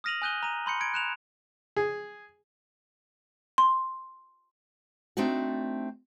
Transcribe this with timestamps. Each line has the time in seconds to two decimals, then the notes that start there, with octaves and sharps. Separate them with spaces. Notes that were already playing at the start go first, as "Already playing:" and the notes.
0.04 D#6 F6 A#6 D#7 F7 F#7
0.22 G#5 D#6 F#6 G6 D#7 G7
0.43 A#5 D#7
0.66 B5 C6 G6 C#7
0.81 G#6 C#7 D7
0.94 F#6 E7 F7
1.77 G#4
3.58 C6
5.17 A3 C4 D4 D#4 F#4